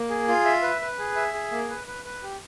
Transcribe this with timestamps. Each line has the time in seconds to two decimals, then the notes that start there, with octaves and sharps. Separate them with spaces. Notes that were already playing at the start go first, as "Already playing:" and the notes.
Already playing: A#3
0.10 G#4
0.28 F4
0.45 E5
0.63 B4
0.81 B4
0.99 G#4
1.16 E5
1.33 G#4
1.51 A#3
1.70 B4
1.87 B4
2.05 B4
2.23 G4